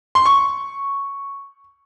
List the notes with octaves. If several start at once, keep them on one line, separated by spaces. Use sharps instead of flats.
C6
C#6